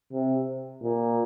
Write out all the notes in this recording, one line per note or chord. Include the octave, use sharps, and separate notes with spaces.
C3
A#2